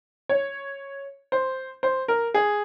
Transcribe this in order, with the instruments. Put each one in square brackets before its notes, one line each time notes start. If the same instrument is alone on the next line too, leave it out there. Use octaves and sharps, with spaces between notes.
[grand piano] C#5
C5
C5
A#4
G#4